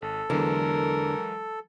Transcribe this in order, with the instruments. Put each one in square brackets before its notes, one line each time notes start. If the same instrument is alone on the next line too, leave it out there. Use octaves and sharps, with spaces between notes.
[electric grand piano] G#1 [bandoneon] A4
[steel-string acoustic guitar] E2 D3 [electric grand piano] E3 F#3 G#3 [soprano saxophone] A#4